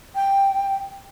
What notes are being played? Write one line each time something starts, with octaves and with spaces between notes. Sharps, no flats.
G5